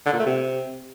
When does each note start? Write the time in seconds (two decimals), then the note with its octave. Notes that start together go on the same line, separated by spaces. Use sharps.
0.06 D3
0.13 A#2
0.20 A3
0.26 C3